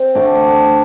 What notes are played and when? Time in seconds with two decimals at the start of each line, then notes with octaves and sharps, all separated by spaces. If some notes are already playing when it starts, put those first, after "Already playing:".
Already playing: C4
0.15 D3 A3 D4 D5